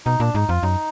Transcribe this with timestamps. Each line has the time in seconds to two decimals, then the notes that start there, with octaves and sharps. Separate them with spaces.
0.06 B2 D#4
0.20 A#2 D4
0.35 G#2 D#4
0.48 F2 F4
0.63 F#2 D#4